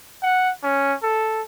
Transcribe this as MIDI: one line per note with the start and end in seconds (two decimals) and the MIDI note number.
0.23 0.50 78
0.63 0.94 61
1.03 1.42 69